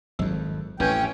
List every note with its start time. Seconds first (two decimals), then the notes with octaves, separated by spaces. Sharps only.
0.19 G#1 F2 F#3
0.80 A1 F2 A2 C#4 B4 G5